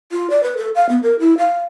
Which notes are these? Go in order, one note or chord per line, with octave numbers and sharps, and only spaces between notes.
F4
D5
B4
A4
F5
B3
A#4
E4
F5